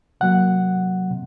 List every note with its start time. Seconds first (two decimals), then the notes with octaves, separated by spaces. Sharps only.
0.21 C3 F#3 A#3 F#5
1.11 C3